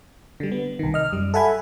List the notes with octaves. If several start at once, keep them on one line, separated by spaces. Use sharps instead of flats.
D3 G3
B3
C2 D#3
D#5 F6
F#2 G3
A4 E5 F#5 G#5 B5 G#6